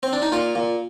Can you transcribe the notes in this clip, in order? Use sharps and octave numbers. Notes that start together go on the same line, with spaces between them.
C4
D4
D#4
A#2 F4
A#2